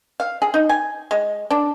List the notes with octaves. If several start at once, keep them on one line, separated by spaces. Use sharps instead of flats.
F5
G#4
D#4
G#5
G#3
D4